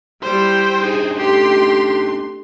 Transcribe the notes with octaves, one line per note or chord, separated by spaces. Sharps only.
G3 E4 C5 G5 C6
D4 D#4 G#4
A3 G4 C6